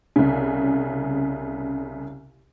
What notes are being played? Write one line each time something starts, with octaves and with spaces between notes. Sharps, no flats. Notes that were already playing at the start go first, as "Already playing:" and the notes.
C2 C#3